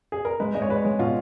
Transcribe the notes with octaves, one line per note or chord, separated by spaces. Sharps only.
G#4
A#4
G#3 B4
G#3 D#5
C#5
G#3 B4
C#5
G#3
B2 F4